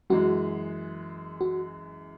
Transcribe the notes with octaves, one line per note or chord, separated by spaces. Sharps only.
F#2 E3 G#3 F#4
F#4